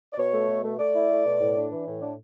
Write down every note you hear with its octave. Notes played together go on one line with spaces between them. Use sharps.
D5
B2 C#5
A3
B2
A3
A3 D5
E4
A3
B2
A2
D4
E3
A2
D4